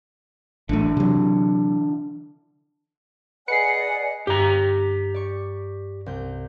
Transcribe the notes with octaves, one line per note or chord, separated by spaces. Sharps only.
A1 D3 E3 A3
C3 F#3
G#4 B4 D5 D#5 F#5 G#5 C7 C#7
G2 G4 A#5
D5 C#6
C2 G6